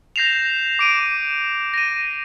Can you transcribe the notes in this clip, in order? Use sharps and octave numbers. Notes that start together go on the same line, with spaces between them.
G6 A#6 C7 E7 F7
D6 D7 D#7
A#6 D#7